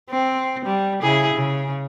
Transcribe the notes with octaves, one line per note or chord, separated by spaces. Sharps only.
C4
G3
C#3 E4 G#4
C#3